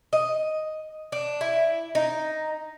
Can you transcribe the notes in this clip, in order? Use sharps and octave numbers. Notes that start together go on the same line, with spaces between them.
D#5
D4
E4
D#4